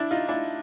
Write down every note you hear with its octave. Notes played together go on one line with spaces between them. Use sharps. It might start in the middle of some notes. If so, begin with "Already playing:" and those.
Already playing: D4 E4
D#4 F4
D4 E4